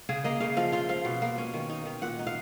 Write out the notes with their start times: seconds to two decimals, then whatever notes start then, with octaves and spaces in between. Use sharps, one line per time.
0.09 C#3 G#4
0.24 A#3 D#5
0.40 C#3 F5
0.57 F3 F5
0.72 F4 F5
0.89 F3 F5
1.05 B2
1.22 A#3
1.38 C#4
1.54 D#3
1.70 D#4
1.85 D#3
2.02 A#2 F#5
2.19 D#4
2.27 F5